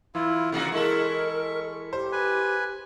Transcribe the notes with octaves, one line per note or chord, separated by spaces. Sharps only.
E3 E4 F4
C3 A#3 F#4
G#3 E4 A4 A#4 C#6
G4 C5
B4 G#5